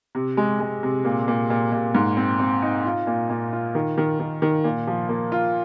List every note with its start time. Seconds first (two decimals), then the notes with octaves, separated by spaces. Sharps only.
0.15 C3
0.37 G#3
0.60 G#3
0.83 C3
1.05 A#2
1.28 A#2
1.50 A#2
1.72 A#2
1.95 G#2
2.17 C4
2.40 C4
2.62 D#4
2.85 F4
3.07 A#2
3.30 A#2
3.53 F4
3.75 D#3
3.98 D#3
4.20 D#3
4.42 D#3
4.64 A#2
4.87 F3
5.09 A#3
5.32 F4